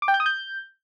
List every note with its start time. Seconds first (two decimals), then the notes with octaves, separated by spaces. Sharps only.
0.02 D6
0.08 G5
0.14 G6
0.20 D#6
0.26 G6